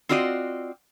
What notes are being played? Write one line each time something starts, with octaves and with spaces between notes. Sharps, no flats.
C4 F4 F#4 D5 D#5